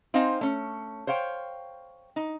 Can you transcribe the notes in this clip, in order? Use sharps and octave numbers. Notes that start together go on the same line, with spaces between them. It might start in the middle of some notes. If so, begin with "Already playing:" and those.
C4 D#4 C5 F5 G#5
A3 C#4
C5 C#5 F5 G5
D#4